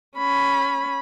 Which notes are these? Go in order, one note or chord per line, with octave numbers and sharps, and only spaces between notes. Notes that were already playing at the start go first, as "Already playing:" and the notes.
C#4 B5